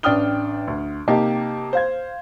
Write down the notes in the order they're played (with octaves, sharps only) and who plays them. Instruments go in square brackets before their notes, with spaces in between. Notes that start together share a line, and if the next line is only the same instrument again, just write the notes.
[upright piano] A1 D4 G5 D#6 F6 G7
D2
C3 A#3 D#4 G4 A5
C5 F5 G#6